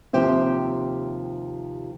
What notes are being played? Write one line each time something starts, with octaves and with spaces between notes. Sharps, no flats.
D#2 C3 F3 G4 C5 E5